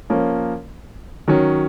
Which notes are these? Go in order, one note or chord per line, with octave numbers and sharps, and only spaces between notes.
F3 A#3 C#4
D#3 F#3 C#4